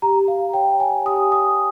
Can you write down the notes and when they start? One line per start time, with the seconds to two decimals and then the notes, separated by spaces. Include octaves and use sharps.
0.02 G4 A#5
0.28 G4 F5
0.53 C#5 G5
0.79 C#5 G#5
1.06 G4 D#6
1.32 G4 D#6